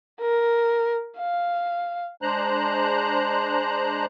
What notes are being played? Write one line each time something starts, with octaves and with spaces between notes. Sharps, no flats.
A#4
F5
G#3 D4 C5 A#5 F#6